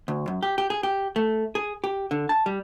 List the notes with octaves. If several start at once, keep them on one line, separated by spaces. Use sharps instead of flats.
D2
F#2
G4
G4
G#4
G4
A3
G#4
G4
D3
A5
G3